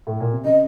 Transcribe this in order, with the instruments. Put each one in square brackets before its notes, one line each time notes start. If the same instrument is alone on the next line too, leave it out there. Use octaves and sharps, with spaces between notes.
[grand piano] A2
A#2
C3
[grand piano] C#3 [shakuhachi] D#5